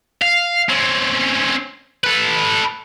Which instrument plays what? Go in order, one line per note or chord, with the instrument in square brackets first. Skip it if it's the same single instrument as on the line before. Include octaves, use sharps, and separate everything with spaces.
[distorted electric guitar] F5
C4 C#4
A4 B4